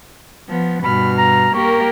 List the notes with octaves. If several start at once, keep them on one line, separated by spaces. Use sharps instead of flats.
F3 B3
G2 B2 B5 F6
A#5
A#3 G4 A#4 C#6